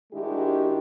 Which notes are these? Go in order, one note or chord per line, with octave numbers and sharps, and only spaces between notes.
D#3 G#3 D4 E4 F#4 G4